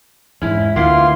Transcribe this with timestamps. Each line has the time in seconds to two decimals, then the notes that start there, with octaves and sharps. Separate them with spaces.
0.42 E2 G#2 C#4 E4
0.76 D2 A#3 B3 E4 F4 C6